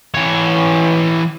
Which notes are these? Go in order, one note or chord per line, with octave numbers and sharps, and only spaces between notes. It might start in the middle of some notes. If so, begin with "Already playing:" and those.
E3 C#5